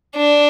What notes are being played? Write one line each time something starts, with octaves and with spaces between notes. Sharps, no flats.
D4